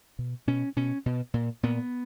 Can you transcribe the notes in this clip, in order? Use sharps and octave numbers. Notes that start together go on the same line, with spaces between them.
B2
B2 C#4
B2 C#4
B2
A#2
A#2 B3